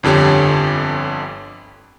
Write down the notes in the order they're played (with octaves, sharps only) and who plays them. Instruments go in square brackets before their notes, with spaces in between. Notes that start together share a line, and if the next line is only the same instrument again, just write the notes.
[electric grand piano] G1 F2 D3 G4 C#5